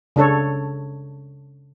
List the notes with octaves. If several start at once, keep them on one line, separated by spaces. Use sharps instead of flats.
C#3 D4 A4 C#5